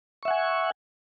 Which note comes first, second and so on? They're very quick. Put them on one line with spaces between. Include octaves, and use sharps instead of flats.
C#6 E5 F#5 G#5